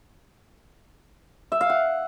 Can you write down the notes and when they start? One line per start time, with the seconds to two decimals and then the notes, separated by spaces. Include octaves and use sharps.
1.52 E5
1.61 F5
1.70 F#5